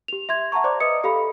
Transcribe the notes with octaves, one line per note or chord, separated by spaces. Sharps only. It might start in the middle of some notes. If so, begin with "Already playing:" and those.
G4 F7
E5 C6 G#6
E5 F#5 A5 A#5 C#6
C5 D5 A#5 C6 D6
B4 D#5 D#6 C#7
G4 A4 F5 B5